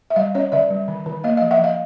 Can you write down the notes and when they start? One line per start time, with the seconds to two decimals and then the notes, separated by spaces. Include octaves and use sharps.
0.10 E5
0.16 G3 D#5 F5
0.35 C#4 C#5 D#5
0.52 D3 D5 E5
0.70 G3
0.88 D#3
1.06 D#3
1.24 A#3 D#5 F5
1.37 F3 D#5 F5
1.51 E5 F#5
1.59 F3 D#5 F5